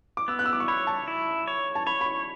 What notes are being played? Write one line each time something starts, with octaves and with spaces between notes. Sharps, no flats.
D6
B3 E6
F#6
E6
D6
C#6
C#5 B5
A5
E4
C#5
A5
C#5 B5
B5
C#6